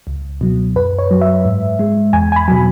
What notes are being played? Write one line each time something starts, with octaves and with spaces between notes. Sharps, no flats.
C#2
B2 F#3
F#2 B4
C#5
F#3
E5
G#2
G#3
E2 G#5
G#5
B5
B2 F#3 G#5